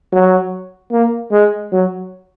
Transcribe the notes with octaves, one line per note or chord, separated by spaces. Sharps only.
F#3
A#3
G#3
F#3